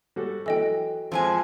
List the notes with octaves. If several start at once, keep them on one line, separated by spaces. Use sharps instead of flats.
G3 F#4 A4
E3 F#3 A4 D#5 G5
F2 F3 G#3 C4 G#5